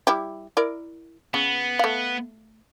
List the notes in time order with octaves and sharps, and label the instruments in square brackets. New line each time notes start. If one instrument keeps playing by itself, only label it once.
[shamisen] G3 E4 G4
E4 A#4 D5
[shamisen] C#3 [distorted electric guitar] B3
[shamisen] A3 F5